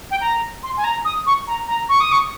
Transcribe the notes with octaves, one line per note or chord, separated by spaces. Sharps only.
G5
A#5
C6
G#5
A#5
D#6
C#6
A#5
A#5
C#6
D#6
C#6